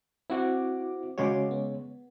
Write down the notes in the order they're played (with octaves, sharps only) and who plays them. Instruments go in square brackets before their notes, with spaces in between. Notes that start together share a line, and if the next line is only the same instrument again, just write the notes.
[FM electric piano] C4 D6 [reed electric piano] E4 F#4
[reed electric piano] C#3 G#3 C#5 [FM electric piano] F#4 C6 D6
[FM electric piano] B3